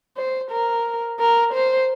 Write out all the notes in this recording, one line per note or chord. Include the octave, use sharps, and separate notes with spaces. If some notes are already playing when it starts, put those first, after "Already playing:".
C5
A#4
A#4
C5